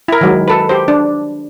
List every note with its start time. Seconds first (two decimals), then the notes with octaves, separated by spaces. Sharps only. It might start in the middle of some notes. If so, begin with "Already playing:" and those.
0.08 E4 A#4
0.21 D#3 F#3 G#3
0.48 A4 B4
0.69 G4 C5
0.88 D4